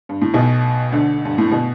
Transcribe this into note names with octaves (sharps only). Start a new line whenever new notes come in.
G2
A2
B1 B2
D2 D3
G2
A2
B2